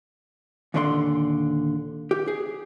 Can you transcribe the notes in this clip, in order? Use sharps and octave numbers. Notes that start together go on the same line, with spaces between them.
D#2 A#2 D3 D5 A#5 C6
G4
G#4